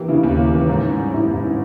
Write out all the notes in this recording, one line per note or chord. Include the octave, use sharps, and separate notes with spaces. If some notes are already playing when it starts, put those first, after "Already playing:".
Already playing: E3 A#3 G4
C#3 E4
D#2 G4
A#3
E3
G#2
C#4
G3
G#2 E4
G#2
C#4